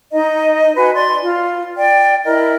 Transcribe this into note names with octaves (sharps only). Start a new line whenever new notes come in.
D#4 D#5 A#5
F#4 B4 G#5
D5 C6
F4
D5 G5
E4 A#4 D#5